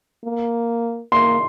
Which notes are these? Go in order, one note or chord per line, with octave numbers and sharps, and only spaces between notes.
A#3
A#3 C6